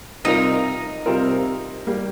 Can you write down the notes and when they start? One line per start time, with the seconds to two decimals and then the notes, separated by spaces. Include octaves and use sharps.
0.24 C3 G3 C4 D#4 F4 A#4
1.06 C3 G3 C4 F4 A#4
1.87 G3 A#3 G4